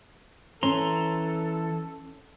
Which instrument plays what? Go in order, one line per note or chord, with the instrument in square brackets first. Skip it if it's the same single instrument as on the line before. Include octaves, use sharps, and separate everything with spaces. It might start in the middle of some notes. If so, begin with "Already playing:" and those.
[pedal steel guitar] E3 A#5 C6 [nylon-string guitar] C#4 [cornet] A4